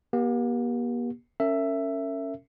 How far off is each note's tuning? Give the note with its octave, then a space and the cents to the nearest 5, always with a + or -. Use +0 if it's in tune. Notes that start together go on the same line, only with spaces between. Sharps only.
A#3 +45 G4 +0
C#4 +0 A#4 -40 E5 +10